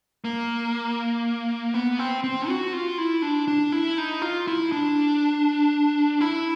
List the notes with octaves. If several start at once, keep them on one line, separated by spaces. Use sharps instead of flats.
A#3
B3
C4
C4
F#4
F4
E4
D4
D4
E4
D#4
F4
E4
D4
E4